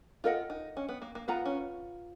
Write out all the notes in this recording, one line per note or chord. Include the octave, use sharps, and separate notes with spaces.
F4 A#4 D#5 F#5
D#4
C#4
B3
A#3
A#3
B3 F4 B4 F#5 A#5
C#4